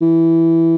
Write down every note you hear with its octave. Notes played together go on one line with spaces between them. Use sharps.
E3